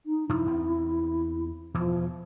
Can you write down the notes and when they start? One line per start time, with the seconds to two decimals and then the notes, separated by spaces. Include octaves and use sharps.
0.06 D#4
0.29 F#2 C3 F3 E4
0.46 E2 C4
1.74 E2 B2 E3 F3